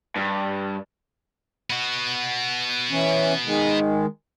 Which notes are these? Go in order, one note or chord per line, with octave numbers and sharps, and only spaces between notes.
G2
B3 F#4
E3 C#4
D#3 G#3